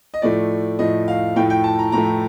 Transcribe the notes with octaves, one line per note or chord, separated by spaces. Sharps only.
D#5
A2 F3 A3 D5
A2 F3 A3 D#5
F5
A2 F3 A3 G5
G5
A5
A#5
A2 F3 A3 A#5